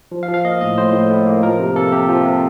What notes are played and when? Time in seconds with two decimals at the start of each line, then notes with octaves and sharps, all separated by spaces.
0.12 F3
0.23 F5
0.28 F3
0.34 F5
0.45 A#3 D#5
0.61 A2 D#5
0.78 A2 C5
0.93 A2
1.10 A2
1.26 A#3
1.43 F3 A#4
1.59 C3
1.76 A#3 A4
1.92 C3 G4
2.09 F3
2.25 C3